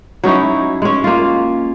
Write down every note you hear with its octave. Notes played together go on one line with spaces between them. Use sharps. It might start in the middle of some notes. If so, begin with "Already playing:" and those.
F#3 C#4 D#4 E4
G#3 C#4
A#3 F4